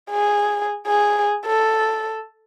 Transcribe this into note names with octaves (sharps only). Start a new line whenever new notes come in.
G#4
G#4
A4